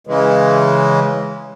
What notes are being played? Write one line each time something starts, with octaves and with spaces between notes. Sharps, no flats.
C#3 E3 G#3